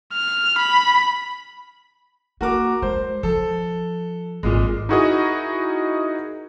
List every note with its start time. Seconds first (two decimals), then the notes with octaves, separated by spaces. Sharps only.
0.13 F6
0.59 B5
2.41 A#3 F#4 A#4 D6
2.82 G#3 C5
3.23 F3 A4
4.43 G#1 A#2 G#3
4.89 D#4 E4 F#4 G#4 A#4 D#5